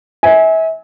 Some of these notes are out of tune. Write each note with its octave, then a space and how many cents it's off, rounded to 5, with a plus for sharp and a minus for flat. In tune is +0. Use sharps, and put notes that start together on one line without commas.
E5 -35 G#5 +0